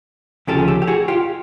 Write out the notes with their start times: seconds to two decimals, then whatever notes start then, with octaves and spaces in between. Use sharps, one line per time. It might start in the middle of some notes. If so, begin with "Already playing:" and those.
0.47 D2 C#3 F3 A3 C#4 G4 A4
0.58 G#4
0.68 G4 A4
0.82 G4
0.87 F#4 G#4
1.08 F4 G4